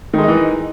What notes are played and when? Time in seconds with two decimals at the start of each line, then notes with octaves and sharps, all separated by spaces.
0.14 D#3
0.18 G#3
0.23 D#4
0.28 E3